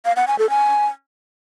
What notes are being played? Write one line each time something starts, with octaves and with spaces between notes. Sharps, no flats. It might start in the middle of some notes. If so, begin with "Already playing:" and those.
F5
F#5
G#5
A4
G#5